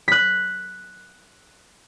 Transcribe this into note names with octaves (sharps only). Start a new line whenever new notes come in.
F#6 B6